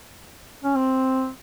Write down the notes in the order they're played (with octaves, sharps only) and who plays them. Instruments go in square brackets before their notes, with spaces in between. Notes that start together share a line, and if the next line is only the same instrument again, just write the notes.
[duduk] C#4
C4